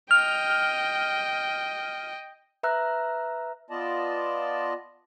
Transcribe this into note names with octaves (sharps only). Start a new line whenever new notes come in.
D#5 G5 F6
B4 E5 A#5 E6 F#6
B3 F4 D5 D#5 A5